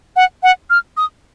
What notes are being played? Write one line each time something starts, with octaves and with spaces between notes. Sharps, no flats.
F#5
F#5
F6
D#6